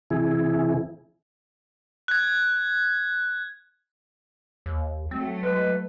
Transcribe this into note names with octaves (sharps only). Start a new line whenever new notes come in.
C3 E3 E4 G#4
F#6 G#6
D#2
F#3 A3 C4
G#3 B4